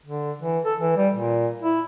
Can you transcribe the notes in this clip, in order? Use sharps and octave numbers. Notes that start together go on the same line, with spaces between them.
D3
E3
A4
E3
G3
A#2
E4